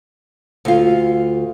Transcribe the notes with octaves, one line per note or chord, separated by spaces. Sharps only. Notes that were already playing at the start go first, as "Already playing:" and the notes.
D2 F4